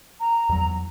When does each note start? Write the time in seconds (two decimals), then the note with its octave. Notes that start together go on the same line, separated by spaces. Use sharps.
0.21 A#5
0.49 E2 F#3